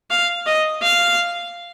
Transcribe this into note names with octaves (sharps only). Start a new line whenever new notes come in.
F5
D#5
F5